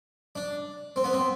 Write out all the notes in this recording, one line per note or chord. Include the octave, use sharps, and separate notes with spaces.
D4
C4
B3
C4